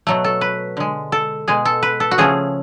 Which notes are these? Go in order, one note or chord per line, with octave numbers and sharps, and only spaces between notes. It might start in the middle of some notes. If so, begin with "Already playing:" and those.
B2 F#3 A3
A4
B4
D3 G#3
A4
B2 G#3 G#4
A4
B4
A4
F#4
C#3 F3 A3 G#4